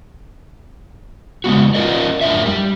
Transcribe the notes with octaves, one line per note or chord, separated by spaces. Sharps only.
C#3 G#3 B3 F#4
C#4 F4 A#4 D5 D#5
F#2 A2 D4 A#4 E5
G3